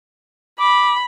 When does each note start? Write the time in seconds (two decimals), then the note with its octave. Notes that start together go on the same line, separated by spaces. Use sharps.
0.60 B5 D6